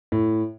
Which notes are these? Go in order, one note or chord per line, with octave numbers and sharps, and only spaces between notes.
A2